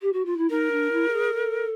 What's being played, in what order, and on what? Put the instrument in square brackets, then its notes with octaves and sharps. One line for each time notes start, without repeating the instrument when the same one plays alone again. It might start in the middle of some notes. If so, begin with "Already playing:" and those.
[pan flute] G4
F#4
F4
E4
[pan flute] D#4 [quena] A#4
[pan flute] D4
E4
A4
G#4
A4